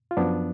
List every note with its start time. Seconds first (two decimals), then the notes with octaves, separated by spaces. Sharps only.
0.11 F4
0.17 F#2 F3 B3 D4